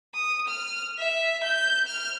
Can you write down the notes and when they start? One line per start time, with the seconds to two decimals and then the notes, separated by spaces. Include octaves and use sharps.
0.15 D#6
0.48 F6
0.98 E5
1.44 G6
1.88 F6